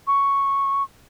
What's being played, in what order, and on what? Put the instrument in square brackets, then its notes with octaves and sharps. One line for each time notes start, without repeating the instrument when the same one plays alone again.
[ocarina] C#6